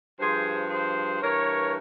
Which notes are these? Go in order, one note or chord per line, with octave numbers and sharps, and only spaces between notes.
G2 F3 G#4 C5
G#4 C5
G2 E3 A#4 C#5